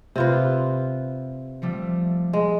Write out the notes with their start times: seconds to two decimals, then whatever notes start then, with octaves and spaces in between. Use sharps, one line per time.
0.16 C3 F4 B4
1.62 F3 G3 A3
2.33 G#3